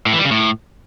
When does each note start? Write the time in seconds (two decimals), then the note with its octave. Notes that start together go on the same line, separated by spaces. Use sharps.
0.06 A2
0.13 E3
0.19 G3
0.25 C#3
0.31 A2